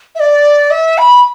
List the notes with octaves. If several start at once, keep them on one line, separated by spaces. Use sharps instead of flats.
E5
D5
E5
B5